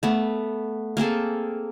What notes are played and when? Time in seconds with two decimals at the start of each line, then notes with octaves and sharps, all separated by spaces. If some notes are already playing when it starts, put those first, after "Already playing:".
0.03 A3 B3
0.97 A#3 C4 G#4 A4